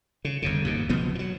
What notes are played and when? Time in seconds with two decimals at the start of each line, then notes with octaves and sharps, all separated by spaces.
0.25 C#3
0.42 G1 F2 C#3
0.65 D#2 G#2 B2
0.89 F#1 B2 F3 B3
1.15 F3 F#3